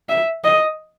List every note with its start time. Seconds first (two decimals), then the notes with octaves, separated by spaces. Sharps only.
0.09 E5
0.44 D#5